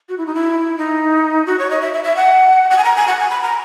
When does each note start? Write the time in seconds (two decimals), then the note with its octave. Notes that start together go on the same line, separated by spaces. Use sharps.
0.09 F#4
0.18 E4
0.26 D#4
0.35 E4
0.78 D#4
1.46 F#4
1.59 C#5
1.70 D#5
1.81 E5
1.94 E5
2.04 E5
2.17 F#5
2.70 F#5
2.78 G#5
2.84 A#5
2.96 G#5
3.07 F#5
3.20 G#5
3.30 B5
3.43 A#5